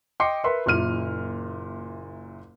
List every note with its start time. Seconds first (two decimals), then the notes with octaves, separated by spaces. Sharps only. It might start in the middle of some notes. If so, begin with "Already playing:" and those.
0.20 D#5 G5 C6 D6 C7 C#7
0.44 A#4 B4 E5 B5 C6
0.66 F#1 A#2 E4 F6 D#7